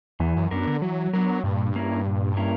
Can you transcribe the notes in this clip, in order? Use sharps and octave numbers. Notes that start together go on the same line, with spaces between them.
E2 E3
F#2
F#2 B3 D4 A#4
D3
E3 F#3
F#3 B3 D4 A#4
G2 A#2
A#3 C#4 E4 A#4
A#2
A#3 C#4 E4 A#4